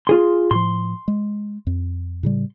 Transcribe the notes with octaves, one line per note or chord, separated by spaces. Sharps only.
F4 G#4 C6
A2 F3 C6
G#3
F2
A2 C#3 G3